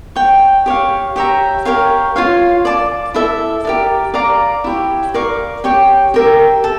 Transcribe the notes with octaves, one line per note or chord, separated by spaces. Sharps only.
C#5 G5 C#6
G4 C#5 F5
G4 C#5 E5 A#5
G4 A#4 C#5 F5
F4 C#5 F5
D5 A5 D6
E4 A4 E5
G4 A#4 D5
D5 F5 A#5 D6
E4 G4 C#5
A#4 D5 F5 C#6
G4 C#5 G5
G4 A#4 E5
A4